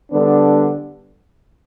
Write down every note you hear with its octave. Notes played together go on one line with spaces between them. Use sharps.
D3 G3 B3 D4